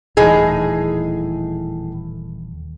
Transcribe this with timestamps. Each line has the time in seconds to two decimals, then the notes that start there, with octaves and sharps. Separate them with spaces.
0.17 D#1 A2 E3 D#4 G#4